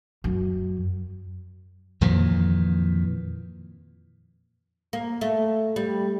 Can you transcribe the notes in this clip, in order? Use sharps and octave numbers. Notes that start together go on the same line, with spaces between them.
F#2
F2 A#2 D#3 E3
A#3
A3
G3